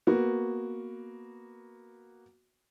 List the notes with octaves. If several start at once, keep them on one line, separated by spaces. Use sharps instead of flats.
A#3 B3 F#4